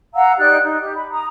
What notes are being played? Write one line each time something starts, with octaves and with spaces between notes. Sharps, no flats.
F5 F#5 A#5 E6
D#4 G4 D5 F#6
D#4
G4
B5
A#5 D#6